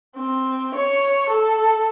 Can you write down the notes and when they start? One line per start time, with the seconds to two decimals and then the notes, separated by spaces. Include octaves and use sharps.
0.16 C4
0.75 C#5
1.30 A4